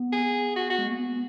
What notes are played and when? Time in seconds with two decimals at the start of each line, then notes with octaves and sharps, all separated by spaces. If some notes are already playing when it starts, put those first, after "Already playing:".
Already playing: B3
0.13 G#4
0.56 F#4
0.71 F#4
0.79 G#3
0.88 A#3
0.99 B3